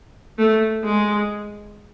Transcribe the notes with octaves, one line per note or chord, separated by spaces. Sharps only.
A3
G#3